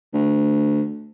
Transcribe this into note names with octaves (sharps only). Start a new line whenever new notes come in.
D2